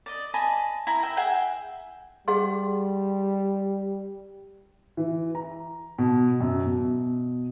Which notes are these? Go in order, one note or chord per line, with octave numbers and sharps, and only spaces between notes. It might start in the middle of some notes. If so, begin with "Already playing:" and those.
D5 D#5
D#5 G#5 A5 B5
E4 A#5
E5 G5
G#4 E5 F#5 G5
G3 G#4 F#5 C6
E3
A#5
B2
F#2
B2